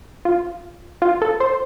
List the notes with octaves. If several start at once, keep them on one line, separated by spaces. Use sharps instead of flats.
F4
F4
A4
C5